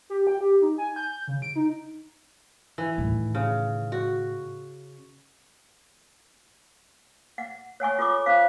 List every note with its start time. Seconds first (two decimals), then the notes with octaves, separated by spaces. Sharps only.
0.10 G4
0.27 G5
0.41 G4
0.61 D#4
0.78 G#5
0.96 G6
1.28 C#3
1.42 D7
1.56 D#4
2.78 E3
2.98 A2 D#3
3.35 C#3
3.92 F#4
7.38 F#5
7.80 C#5 F#5 G#5 C#6
7.99 F4 A4 C#5 C#6 D6
8.26 C#4 F4 C5 F5